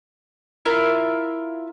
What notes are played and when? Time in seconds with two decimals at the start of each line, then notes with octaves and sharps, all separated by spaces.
0.65 E4 F4 A#4 E5